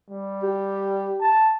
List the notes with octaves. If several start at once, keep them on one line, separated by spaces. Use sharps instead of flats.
G3
G4
A5